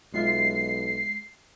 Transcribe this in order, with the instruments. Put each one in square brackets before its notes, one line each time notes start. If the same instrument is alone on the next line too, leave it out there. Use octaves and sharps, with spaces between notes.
[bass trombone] B1 [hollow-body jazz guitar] G#3 F4 E5 [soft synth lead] C7